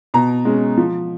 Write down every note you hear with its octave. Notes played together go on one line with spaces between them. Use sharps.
B2 A#5
G#3 C#4
F3